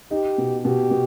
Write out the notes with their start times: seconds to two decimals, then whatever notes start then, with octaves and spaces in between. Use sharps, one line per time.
0.11 D#4 G4
0.38 B2
0.65 B2 G4
0.91 B2